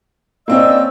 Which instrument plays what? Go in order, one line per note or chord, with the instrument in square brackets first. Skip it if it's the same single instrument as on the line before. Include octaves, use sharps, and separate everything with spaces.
[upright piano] A#3 C4 C#4 [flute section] D5 D#5 E6